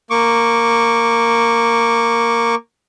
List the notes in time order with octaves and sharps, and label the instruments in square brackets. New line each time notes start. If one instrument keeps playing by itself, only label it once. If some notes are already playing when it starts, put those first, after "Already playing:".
[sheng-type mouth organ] A#3 C#6 D6